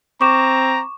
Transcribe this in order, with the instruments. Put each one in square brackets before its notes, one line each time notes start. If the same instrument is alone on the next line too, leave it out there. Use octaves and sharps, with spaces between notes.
[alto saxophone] C4 [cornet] A#5 [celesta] C#6 D6 E7